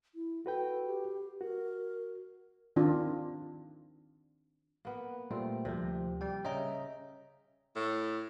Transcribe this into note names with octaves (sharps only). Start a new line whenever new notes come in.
E4
F#4 A4 B4 G5
G4
F#4 A#4
D#3 C4 D4 F4
A#3 B3
A#2 G3 A3 C4
D2 C3 F3
G3 G5
C#3 D#5 E5 G5 A#5
A2